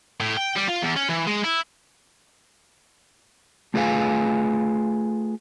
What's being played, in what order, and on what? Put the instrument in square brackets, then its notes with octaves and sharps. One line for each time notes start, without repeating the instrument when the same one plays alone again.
[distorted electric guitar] A2
G5
G3
F4
E2
C#4
E3
G#3
E4
[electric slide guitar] A3 F4 G#4 B4 F5 G#5